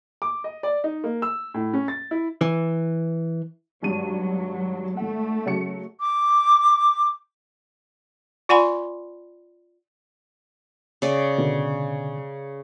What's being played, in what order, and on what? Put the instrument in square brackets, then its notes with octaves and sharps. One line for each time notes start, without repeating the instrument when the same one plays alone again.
[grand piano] D6
D#5
D5
D#4
A#3
E6
A2
C#4
A6
E4
[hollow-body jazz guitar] E3
[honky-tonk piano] G#1 G2 D#7 [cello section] F#3
[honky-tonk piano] G#1 F#5 [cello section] A3
[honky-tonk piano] C#3 F#3 C#7
[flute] D6
[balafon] F4 D5 F#5 G#5 B5 C6
[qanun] C#3 D5
[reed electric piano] B2 D3